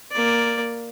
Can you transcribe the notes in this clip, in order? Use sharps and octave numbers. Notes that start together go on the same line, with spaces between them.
A#3 D5